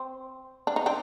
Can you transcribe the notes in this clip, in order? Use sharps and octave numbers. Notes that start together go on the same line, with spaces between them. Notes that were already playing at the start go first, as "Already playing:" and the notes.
Already playing: C4
D4
D#4
C4 D4